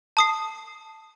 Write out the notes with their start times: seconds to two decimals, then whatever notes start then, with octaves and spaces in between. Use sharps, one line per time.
0.17 A5 D#6 C7